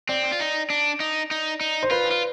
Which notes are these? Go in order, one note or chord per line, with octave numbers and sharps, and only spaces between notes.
C4 D5
F4
D#4
D4
D#4
D#4
D#4
C5
F4 B4
F4